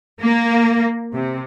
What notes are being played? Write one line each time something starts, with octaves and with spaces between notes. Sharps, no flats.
A#3
C3